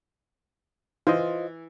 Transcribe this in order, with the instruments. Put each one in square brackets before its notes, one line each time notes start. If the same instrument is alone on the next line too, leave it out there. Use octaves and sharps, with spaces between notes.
[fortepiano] E3 [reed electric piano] F4 C5 D#5